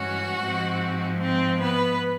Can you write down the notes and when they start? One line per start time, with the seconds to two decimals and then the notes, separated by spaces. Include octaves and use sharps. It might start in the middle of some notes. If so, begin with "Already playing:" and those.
Already playing: G2 E3 G#3 C#4 F#4
0.41 G#2 F3 G#3 C4
1.21 C4 C5
1.61 B3 B4